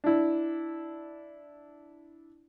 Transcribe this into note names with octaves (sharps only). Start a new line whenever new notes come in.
D4 E4